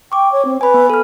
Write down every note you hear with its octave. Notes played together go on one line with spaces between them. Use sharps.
G5 C#6 D6
C#5
C4
B4 G#5 B5
B3
A4 F6